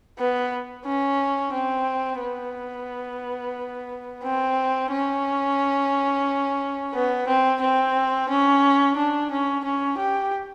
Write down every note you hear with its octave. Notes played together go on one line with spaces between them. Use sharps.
B3
C#4
C4
B3
C4
C#4
B3
C4
C4
C#4
D4
C#4
C#4
G4